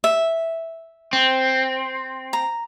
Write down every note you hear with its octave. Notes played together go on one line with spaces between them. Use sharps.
E5
C4
A#5